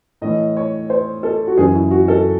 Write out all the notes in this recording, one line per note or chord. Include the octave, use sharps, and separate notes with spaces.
A2 E3 D#5
C#5
C5
A4
F#4
F#2 C#3 E3 G#4
E4
F#4
A4